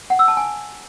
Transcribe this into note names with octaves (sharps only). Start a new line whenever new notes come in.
F#5
E6
A5
G#5